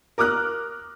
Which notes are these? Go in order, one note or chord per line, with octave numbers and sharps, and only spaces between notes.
A#4 D6 D#6 F6 F#6